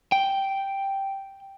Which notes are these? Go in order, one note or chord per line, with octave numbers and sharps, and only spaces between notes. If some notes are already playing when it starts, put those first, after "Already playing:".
G5